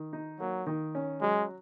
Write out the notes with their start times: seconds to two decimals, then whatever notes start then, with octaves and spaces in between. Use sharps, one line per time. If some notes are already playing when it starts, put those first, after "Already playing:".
Already playing: D#3
0.13 D#4
0.40 F#3 A#3
0.66 D#3
0.95 C#4
1.21 F#3 G#3